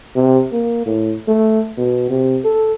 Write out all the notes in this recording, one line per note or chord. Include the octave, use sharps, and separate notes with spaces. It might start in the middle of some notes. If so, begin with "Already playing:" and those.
C3
A#3
A2
A3
B2
C3
A4